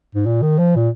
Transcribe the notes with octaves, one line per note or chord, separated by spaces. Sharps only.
G#2
A#2
D#3
F3
A#2